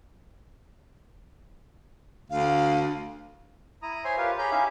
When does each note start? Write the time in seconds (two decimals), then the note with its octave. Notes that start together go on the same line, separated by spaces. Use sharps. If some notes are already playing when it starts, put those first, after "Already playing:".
2.30 D2 F5
3.82 E4 A#5 D#6
4.04 C5 C#5 E5 G#5 C6
4.17 F4 G4 A#4 B4 C#5 F5
4.38 G4 G#4 C#5 A#5 B5 G6
4.51 C#4 D#4 E4 G4 E5 F5